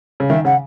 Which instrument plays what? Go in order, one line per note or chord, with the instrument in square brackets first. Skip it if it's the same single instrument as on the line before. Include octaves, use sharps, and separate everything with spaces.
[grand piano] C#3
[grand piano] D#3 [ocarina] E5
[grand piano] C#3 [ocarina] F#5